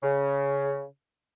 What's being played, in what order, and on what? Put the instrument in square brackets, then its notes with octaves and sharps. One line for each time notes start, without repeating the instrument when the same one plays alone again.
[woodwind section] C#3